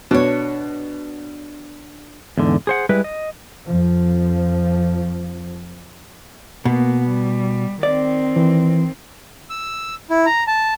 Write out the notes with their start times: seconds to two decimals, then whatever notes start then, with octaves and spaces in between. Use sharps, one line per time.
0.11 B2 D4 C#5
2.38 E2 G#2 D3
2.67 G#4 C5 F#5
2.89 G3 G#3 E4 B4
3.04 D#5
3.66 F2 F3
6.65 B2 A#3 B3
7.08 G3
7.83 D#3 C4 D5
8.36 E3
9.50 E6
10.10 E4
10.26 A#5
10.47 A5